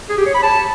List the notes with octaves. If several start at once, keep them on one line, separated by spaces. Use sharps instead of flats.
G#4
G4
C#5
B5
A5